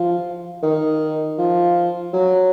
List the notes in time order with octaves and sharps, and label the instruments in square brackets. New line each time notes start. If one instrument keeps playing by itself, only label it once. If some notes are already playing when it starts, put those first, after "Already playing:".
Already playing: [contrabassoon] F3
D#3
F3
F#3